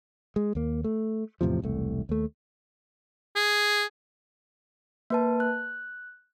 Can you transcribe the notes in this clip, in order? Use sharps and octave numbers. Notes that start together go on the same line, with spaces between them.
G#3
D#2 A#3
A3
E2 A2 C3 F3
E1 C2 A3
D#2 A3
G#4
A#3 B4 A5
F#6